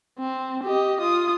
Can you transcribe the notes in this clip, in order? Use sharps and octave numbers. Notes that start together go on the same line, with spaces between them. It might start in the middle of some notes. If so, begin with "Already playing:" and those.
C4
G4 D#5
F4 D#6